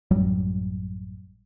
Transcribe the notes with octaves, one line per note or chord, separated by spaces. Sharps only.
A1 F#2 F#3 G3